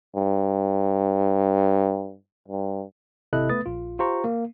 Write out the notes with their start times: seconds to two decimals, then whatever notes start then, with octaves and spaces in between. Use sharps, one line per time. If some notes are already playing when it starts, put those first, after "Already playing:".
0.16 G2
2.48 G2
3.33 G#1 C3 E4 A4 D#5 F#6
3.49 A3 B3 B4 D#6 A6
3.66 A#1 F4
3.99 F4 G4 C5 A#5 C#6
4.24 A#3